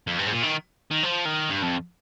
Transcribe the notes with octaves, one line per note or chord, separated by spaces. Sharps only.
F2
G2
G#2
A#2
D#3
D#3
F3
D#3
G2
F2